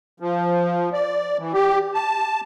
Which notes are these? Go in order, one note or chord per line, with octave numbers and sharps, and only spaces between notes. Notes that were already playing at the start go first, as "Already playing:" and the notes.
F3
D5
E3
G4
A5